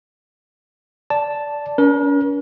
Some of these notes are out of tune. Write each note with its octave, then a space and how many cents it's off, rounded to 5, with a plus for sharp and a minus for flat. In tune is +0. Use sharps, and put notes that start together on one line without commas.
D5 -10 A5 +0
C#4 +40 A#4 +40